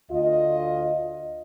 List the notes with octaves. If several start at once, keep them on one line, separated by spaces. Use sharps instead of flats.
D2 F4 D#5